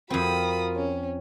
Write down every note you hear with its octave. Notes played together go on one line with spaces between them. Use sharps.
F2 C4 F4 F#4 A#4 B5 D#6
C#4